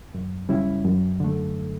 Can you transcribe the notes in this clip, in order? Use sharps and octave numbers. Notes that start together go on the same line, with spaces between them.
F#2
C#3 G3 C#4 E4
F#2
D3 A3